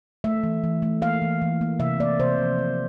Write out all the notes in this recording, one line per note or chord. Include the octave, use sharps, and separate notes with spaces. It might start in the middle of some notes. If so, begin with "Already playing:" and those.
A3 E5
E3
E3
A3
A#3 F5
E3
E3
A#3
C3 E5
A#3 D5
C3 C5
F3
A#3